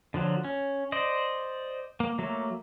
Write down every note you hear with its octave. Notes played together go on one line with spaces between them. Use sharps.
D3 F3 F#3
C#4
C5 D5 D#5
A#3
F#3 A3 A#3